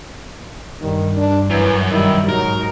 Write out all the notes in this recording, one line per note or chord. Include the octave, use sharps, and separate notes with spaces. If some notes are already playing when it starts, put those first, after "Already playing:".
G2 D#3
D4
F#2 E3
D#3 G3 E4
G#2 F#3 D#4 A#4